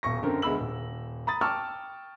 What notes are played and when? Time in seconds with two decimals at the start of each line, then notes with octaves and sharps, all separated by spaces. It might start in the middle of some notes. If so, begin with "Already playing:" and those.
0.03 D#1 B1 C#6 A#6
0.23 F#2 D3 C4 A#4
0.42 D2 G#3 B3 B5 E6 F#7
0.60 D#1
1.27 A#5 B5 D#6 A6
1.41 G5 A5 C#6 D6 E6 F6